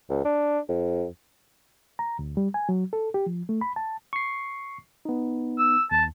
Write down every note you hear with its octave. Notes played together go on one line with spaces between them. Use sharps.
C#2
D4
F2
A#5
D2
G3
G#5
F#3
A4
G4
F3
A3
B5
A5
C#6 C7
B3 D#4
E6
D#2 A5